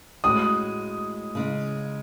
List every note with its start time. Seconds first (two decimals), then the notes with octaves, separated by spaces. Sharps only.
0.24 A2 G#3 C#4 F#4 D#6
1.35 C#3 G#3 D#4